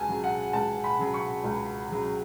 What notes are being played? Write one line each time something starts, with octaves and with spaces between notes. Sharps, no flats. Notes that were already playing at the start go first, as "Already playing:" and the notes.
Already playing: C#2 G#5 A5
C#3 F#3
F#5
C#2 A5
B5
C#3 F#3
C#6
C#2
C#3 F#3